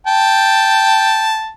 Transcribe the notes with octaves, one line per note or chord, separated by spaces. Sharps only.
G5 A5